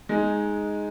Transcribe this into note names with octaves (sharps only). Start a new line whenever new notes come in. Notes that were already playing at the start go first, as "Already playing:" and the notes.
G#3 D#4 G#4